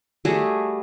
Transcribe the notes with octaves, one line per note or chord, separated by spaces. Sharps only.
G3 A3 F#4 G#4